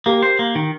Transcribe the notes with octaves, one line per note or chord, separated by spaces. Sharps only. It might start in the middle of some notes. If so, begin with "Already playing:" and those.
A#3 G4 A#4
C5
A#3
D#3